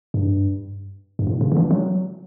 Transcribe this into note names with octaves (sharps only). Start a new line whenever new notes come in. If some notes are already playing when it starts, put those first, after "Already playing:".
G2
G2
A2
C#3
D3
E3
F#3